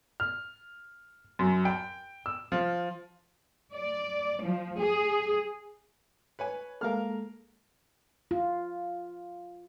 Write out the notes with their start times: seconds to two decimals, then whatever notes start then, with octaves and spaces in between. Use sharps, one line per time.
0.20 F6
1.39 F#2
1.65 G5
2.26 E6
2.52 F3
3.73 D5
4.42 F3
4.78 G#4
6.39 B4 C#5 G#5
6.81 G#3 A#3 A4 A#4 F5 F6
8.31 F4